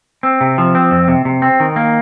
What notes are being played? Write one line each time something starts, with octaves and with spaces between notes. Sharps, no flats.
C4
C3
F3
C4
F2
C3
C3
C4
D#3
A#3